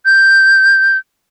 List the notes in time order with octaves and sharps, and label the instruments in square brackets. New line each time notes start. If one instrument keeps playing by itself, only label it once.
[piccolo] G6